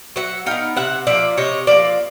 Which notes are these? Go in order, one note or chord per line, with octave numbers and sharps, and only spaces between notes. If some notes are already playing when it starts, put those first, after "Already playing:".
F#3 E5 F#5
B3 D#4 F5 G5
C3 E5 F#5
F3 A#3 D5 E5
C3 C#5 D#5
F3 A#3 D5 E5